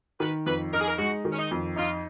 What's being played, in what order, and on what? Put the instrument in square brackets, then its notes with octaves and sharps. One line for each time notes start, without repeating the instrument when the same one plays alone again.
[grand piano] D#3 [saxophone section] B4
[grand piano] F2 [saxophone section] B4
[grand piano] D#4 [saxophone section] A#4
[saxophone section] G#4
A#4
[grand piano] G#3 [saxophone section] F#4
[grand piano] D#3
[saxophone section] C#4
D#4
[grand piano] F2
[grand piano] D#4 [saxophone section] F4